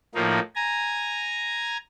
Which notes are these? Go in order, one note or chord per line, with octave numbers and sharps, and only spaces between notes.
A2 F3 A#3 D#4
G#5 A#5